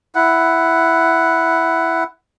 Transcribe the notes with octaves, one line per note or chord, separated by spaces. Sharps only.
E4 F#5